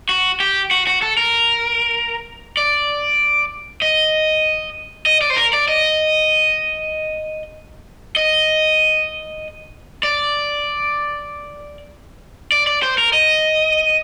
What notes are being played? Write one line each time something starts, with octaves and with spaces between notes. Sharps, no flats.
F#4
G4
F#4
F#4
A4
A#4
D5
D#5
D#5
D5
C5
A#4
D5
D#5
D#5
D5
D5
D5
C5
A#4
D#5